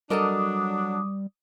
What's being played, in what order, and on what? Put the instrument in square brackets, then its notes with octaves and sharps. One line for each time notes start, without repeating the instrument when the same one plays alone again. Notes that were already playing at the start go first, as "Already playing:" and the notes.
[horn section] F#3 D4 [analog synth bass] G3 [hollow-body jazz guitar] A4 A#4 D#5 [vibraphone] D6 D#6